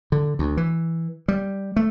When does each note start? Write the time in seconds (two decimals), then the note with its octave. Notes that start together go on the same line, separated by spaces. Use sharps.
0.12 D3
0.39 D2
0.57 E3
1.28 G3
1.76 A3